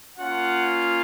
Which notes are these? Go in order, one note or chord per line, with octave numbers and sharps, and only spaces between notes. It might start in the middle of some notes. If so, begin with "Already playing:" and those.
A#3 C#4 F4 F#5